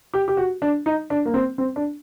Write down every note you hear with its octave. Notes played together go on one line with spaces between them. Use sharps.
G4
G4
F#4
D4
D#4
D4
A#3
C4
C4
D4